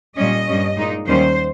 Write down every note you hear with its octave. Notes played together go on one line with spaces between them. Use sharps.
A#2 G3 C#4 D#5
G2 G3 C#4
A#2 G#3 D#4
D#2 D#3 G3 C#4 C5